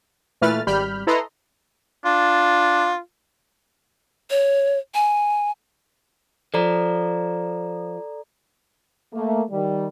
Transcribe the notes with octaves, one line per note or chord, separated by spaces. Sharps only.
A#2 E3 A3 B4 F6 A6
G#1 G3 B5 F6 G6
E4 A4 B4 D#5 A#5 C6
D4 F4
C#5
G#5
F3 A4 D5 A#5
A3 A#3
D#3 G3